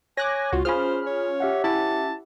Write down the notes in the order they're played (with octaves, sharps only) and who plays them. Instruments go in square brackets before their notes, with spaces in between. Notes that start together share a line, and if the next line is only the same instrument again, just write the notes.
[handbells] C#5 [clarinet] G#5 [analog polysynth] D6 F#6 A#6
[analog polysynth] C#2 F#4 [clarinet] F4
[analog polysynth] C#4 F4 F6 [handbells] G#4 B5 [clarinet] C5
[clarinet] C#5
[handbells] G4 E5 F#5
[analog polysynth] C#4 E4 [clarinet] A5